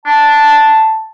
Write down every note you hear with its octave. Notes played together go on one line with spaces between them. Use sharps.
D4 A5